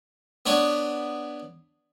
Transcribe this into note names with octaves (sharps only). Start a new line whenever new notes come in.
B3 D4 C#5